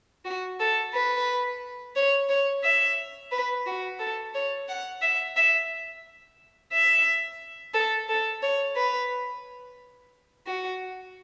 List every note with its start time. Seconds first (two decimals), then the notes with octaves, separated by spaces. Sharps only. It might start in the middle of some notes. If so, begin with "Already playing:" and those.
0.25 F#4
0.60 A4
0.94 B4
1.96 C#5
2.29 C#5
2.64 E5
3.32 B4
3.66 F#4
3.99 A4
4.35 C#5
4.69 F#5
5.02 E5
5.36 E5
6.73 E5
7.74 A4
8.09 A4
8.42 C#5
8.76 B4
10.47 F#4